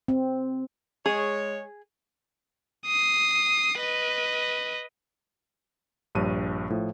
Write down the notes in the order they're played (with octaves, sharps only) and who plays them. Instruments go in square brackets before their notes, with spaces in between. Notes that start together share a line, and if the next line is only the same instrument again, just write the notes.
[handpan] C4
[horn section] G#3 C#5 [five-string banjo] G#4
[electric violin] D#6 C7
B4 D#5
[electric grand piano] A#1 G2 C#5 A5 D#7
A2 F3